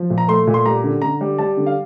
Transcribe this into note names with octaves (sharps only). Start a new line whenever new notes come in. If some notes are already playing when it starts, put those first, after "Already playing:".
Already playing: F3
A#2
A#5
A3 C6
A#2
C6
G3 A#5
D3
D3 A#5
G3
G3 A5
D3
F5